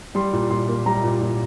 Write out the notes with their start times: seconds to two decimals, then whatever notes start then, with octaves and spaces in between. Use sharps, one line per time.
0.15 G3 C6
0.33 A#2
0.50 A#2 C6
0.69 A#3
0.86 G3 A#5
1.04 A#2
1.21 A#2